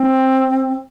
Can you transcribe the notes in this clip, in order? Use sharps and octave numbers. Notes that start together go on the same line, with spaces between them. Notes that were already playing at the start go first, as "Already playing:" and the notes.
Already playing: C4